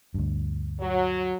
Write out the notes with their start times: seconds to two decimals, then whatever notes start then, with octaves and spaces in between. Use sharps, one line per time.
0.14 D2 G2
0.81 F#3